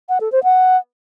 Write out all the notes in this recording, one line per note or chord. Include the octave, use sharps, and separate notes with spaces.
F#5
A4
C5
F#5